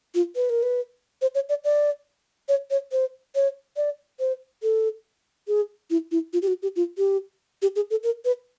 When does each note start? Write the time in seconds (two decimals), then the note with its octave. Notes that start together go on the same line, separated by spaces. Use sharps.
0.15 F4
0.36 B4
0.50 A#4
0.63 B4
1.22 C5
1.35 C#5
1.49 D5
1.64 D5
2.49 C#5
2.71 C#5
2.92 C5
3.35 C#5
3.77 D5
4.20 C5
4.63 A4
5.48 G#4
5.90 E4
6.11 E4
6.33 F4
6.42 G4
6.48 F#4
6.62 G4
6.76 F4
6.98 G4
7.62 G4
7.76 G#4
7.91 A4
8.04 A#4
8.25 B4